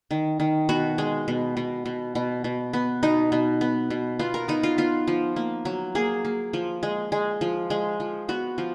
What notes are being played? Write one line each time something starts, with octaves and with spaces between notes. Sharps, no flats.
D#3
D#3
B2 F#4
G#3
B2
B2
B2
B2
B2
B3
B2 D#4
B2
B3
B2
B3 F4
A#4
B3 D#4
F4
B3 F4
F3
A#3
F#3
A#3 G#4
A#3
F3
G#3
G#3
F3
G#3
F3
B3 F#4
F3